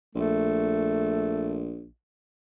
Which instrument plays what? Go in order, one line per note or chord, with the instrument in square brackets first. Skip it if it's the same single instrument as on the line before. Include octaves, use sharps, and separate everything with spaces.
[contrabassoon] A#1 [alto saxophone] A3